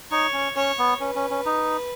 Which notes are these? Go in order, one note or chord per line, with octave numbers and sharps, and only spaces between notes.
D#4 C#5
C#4
C#4 C#5
B3
C#4 B4
C#4
C#4
D#4